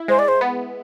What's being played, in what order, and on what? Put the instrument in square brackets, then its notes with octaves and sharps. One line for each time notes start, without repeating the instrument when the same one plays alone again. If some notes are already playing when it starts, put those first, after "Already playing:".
Already playing: [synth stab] E4
[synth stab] G#3 [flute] C5
[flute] D5
C5
[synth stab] B3